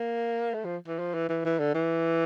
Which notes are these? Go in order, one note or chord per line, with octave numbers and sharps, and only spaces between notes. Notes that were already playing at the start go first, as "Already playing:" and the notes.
Already playing: A#3
A3
F3
E3
F3
E3
E3
E3
D3
E3